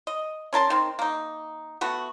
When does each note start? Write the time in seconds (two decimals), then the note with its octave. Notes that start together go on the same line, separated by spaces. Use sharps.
0.07 D#5
0.53 C#4 A#4 A5 C6
0.70 D#3 C4
0.99 A#3 D#4
1.81 A3 B3 F#4